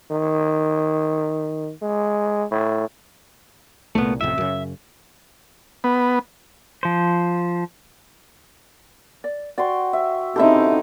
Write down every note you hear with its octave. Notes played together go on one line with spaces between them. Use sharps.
D#3
G#3
A2
C2 A#2 A3 B3
A1 F2 C3 E5
F#2 C#3
B3
F3 C5
D5
F#4 D5 G5 C6
E5
C#3 C4 D#4 E4 G4 A4 E5